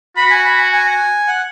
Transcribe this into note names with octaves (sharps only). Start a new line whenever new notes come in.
F#4 B5
G#5
B5
G#5
G#5
F#5